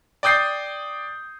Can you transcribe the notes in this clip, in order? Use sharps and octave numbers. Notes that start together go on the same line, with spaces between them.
D5 G5 D#6 G6 C7